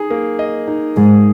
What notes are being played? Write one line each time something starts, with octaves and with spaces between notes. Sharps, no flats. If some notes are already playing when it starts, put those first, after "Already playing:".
Already playing: D#4 G#4
A#3
D#5
D#4
G#2 G#4